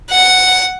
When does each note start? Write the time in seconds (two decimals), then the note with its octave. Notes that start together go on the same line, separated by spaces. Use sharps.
0.10 F#5